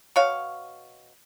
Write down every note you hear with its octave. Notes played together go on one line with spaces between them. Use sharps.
B2 C#5 F5